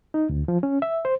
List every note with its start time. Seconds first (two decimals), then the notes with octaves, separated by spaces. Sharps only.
0.14 D#4
0.29 D2
0.48 F3
0.63 C#4
0.82 E5
1.05 C5